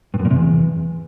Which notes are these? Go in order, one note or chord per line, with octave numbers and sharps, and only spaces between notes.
G2
F#2
A#2
C3
E2